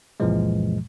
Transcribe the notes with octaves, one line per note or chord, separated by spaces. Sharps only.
C#2 F#2 A#2 E3 F3 G#3